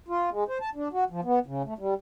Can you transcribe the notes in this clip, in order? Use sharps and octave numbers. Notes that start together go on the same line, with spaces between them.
F4
G#3
C5
A5
D4
F#4
F3
B3
C#3
A3
G3